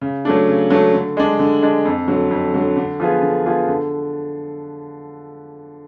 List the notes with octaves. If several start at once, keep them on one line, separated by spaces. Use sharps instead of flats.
C#3
F#3 A3 D4
C#3
F#3 A3 D4
D3
G#3 D4
D3
G#3 D4
F2
D3 F#3
F2
D3 F#3
D3
F3 B3 F4 G#4
D3
F3 B3 F4 G#4
D3